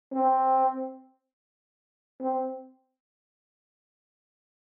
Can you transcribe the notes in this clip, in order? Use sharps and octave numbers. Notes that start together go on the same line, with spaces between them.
C4
C4